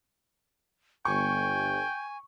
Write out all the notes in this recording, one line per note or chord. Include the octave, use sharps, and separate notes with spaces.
G1 G5 G#5 C#6